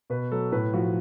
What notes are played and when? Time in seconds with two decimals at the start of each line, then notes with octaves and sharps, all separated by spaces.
0.10 B2 B4
0.32 F#3 A4
0.52 A2 B4
0.73 F3 F#4